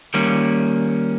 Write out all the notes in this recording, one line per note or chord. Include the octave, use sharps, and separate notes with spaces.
D#3 G3 A#3 C#4